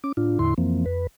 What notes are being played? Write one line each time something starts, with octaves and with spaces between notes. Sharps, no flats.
C#4 D6
A2 D4 F4
E2 A2 D3 E4 C6
F2 E3 F3 A#3 C4
F2 B4